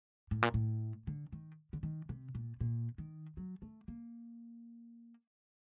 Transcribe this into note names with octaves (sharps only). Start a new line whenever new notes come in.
A2
A#2
A2
D3
D#3
D3
D#3
C3
A#2
A#2
D#3
F#3
A3
A#3